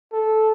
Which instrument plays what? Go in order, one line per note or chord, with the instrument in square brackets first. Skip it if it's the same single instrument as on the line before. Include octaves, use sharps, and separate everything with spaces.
[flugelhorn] A4